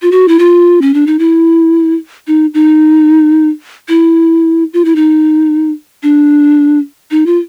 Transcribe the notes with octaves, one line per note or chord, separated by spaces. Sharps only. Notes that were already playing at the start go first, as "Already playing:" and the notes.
F4
F#4
E4
F4
C#4
D4
D#4
E4
D#4
D#4
E4
F4
E4
D#4
D4
D#4
F4